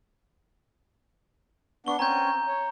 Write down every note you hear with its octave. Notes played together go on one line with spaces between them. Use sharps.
B3 D4 C#6 G7
C4 C#4 G#5 A#5 G6
C#5